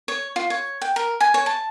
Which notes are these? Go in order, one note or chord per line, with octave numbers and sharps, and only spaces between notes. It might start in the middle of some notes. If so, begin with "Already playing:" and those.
C#5
F4
C#5
G5
A#4
G#5
C#5
A5